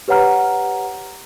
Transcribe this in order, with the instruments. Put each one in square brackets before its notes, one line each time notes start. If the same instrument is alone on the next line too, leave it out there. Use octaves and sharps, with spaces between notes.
[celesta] G4 B4 C#5 F#5 A#5 F6